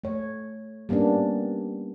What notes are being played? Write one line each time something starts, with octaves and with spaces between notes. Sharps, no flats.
A3 C#5
G3 A#3 B3 C#4 D4